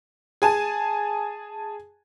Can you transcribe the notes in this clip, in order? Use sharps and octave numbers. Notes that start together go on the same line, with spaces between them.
G#4 G#5 A5